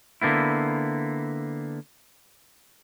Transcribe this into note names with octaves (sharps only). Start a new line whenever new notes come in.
D3 A#3 B3 E4